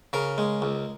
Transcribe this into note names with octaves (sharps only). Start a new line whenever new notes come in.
C#3 A#4
G#3
C#2